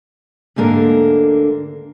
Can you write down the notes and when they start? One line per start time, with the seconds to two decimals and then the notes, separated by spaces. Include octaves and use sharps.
0.56 D2 G#2 D3 A#3 A#4